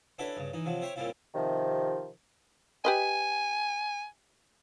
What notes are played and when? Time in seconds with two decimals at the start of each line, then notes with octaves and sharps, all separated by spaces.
0.19 C#4 D4 E4 F#4 A4 B4
0.37 G2 C#3
0.53 E3 D#4
0.65 C3 F3 F#3
0.82 C5 C#5 E5 G5 C6 C#6
0.96 A#2 G3 C4 C#4 E4 F4
1.34 C3 D#3 F3
2.85 G4 B4 D#5 G#5